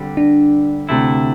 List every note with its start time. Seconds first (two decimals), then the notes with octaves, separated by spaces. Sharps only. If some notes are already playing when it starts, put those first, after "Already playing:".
Already playing: D3 G3 C4
0.17 D4
0.89 D2 C3 A3 E4